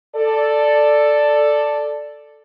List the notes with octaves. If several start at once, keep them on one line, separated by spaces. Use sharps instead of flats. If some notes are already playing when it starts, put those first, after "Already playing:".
A4 D5